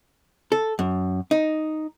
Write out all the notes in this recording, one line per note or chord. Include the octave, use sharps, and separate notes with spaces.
A4
F#2
D#4